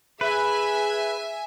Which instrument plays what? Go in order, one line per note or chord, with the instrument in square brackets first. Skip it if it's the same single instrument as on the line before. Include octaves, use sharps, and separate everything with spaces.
[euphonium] G#4 [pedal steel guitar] B4 [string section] E5 G#5